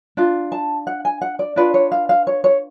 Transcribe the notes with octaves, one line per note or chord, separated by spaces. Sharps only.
D4 F4
A5
F#5
G#5
F#5
D5
D4 F4 B4 D5
C#5
F5
F5
C#5
C#5